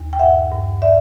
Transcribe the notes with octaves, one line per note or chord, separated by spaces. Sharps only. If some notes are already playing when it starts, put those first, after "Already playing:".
Already playing: D#2
G5
G2 E5 F#5
G2
D5 E5